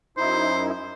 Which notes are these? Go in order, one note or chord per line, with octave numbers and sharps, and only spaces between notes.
F#2 D#4 E4 C5